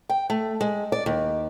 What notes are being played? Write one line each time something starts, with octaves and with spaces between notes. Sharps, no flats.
G5
A3
G#3
D5
D#2